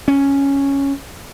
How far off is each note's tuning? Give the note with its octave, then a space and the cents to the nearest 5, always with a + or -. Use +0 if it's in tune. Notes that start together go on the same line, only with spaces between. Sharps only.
C#4 +0